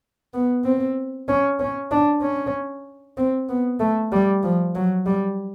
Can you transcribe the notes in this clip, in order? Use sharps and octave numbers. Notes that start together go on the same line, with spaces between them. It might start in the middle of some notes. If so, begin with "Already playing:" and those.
B3
C4
C#4
C#4
D4
C#4
C4
B3
A3
G3
F3
F#3
G3